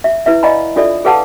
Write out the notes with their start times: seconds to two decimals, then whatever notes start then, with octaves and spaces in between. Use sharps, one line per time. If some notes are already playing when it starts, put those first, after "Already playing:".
0.04 E5
0.26 E4 B4 E5
0.43 D5 D#5 F5 G#5 A#5 B5
0.76 D4 F4 A4 D5 E5
1.05 G#4 A4 B4 F5 F#5 A5